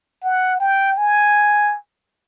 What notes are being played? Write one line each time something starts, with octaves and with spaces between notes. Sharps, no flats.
F#5
G5
G#5